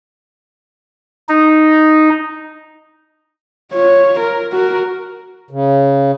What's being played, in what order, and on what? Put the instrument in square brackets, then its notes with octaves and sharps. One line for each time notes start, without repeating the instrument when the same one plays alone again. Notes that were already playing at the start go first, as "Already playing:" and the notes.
[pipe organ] D#4
[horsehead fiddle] F4 C#5
A#4
F#4 A#4
[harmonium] C#3